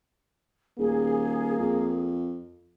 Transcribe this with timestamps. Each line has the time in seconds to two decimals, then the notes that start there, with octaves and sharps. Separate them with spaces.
0.78 D#1 A#3 G#4
1.59 F2